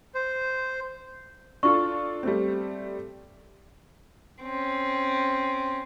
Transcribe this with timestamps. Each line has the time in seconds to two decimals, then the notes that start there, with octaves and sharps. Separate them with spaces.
0.15 C5
1.63 D4 F4 A4 C#6
2.23 G3 A3 C4
4.43 C4 C#4